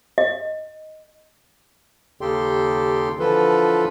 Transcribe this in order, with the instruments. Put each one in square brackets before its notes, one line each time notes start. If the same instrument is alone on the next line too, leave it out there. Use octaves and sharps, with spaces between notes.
[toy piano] D#5
[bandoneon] D#2 C#3 G4 A4 G5 C6
D3 E3 F3 F4 A4 B4